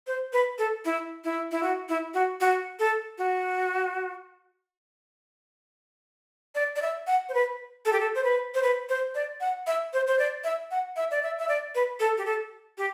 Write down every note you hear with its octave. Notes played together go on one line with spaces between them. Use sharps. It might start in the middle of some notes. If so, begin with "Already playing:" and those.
C5
B4
A4
E4
E4
E4
F#4
E4
F#4
F#4
A4
F#4
D5
D5
E5
F#5
C5
B4
A4
G4
A4
C5
B4
C5
B4
C5
D5
F#5
E5
C5
C5
D5
E5
F#5
E5
D5
E5
E5
D5
B4
A4
G4
A4
G4